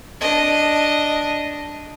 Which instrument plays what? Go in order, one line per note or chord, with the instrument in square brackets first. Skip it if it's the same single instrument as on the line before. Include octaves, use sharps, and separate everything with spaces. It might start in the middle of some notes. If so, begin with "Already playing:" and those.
[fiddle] D4 D#5